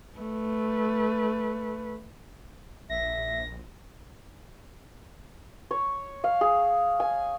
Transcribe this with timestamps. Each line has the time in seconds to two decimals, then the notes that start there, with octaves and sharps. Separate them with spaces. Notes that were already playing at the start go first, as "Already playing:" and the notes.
0.19 A3 B4
2.90 A#1 E5 A#6
5.71 C#5
6.24 F5
6.41 G#4
7.00 G#5